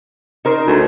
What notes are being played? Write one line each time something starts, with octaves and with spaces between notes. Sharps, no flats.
D#4 A#4 C5
D2